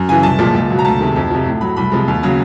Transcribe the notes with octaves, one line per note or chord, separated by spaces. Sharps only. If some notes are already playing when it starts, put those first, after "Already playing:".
Already playing: F#2
C#3 E3 G#5
C2 A5
A#2 F3 G#3
C#2
B2 F#3
A#5
D2 A5
C3 D#3 G#3
F2
C3 F3
A2
F#3 B5
C2 B5
C3 F3 G#3
D#2
C#3 F#3